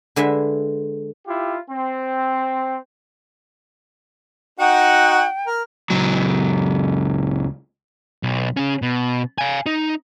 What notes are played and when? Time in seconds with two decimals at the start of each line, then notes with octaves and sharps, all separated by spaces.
0.16 D3 G#3 B4 E5
1.27 E4 F4 G4
1.70 C4
4.59 D#4 F#4 F#5 G5
5.46 A#4
5.90 C#2 F#3
8.23 B1
8.57 C#3 C#4
8.82 B2
9.38 F5 G#5
9.66 D#4